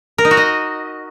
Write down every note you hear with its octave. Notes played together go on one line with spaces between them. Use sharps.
A#4
D#4
F#4
D#5